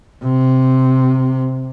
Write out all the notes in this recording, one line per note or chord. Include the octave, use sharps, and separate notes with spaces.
C3